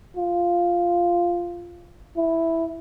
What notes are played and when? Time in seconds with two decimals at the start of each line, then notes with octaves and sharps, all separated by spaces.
0.17 F4
2.17 E4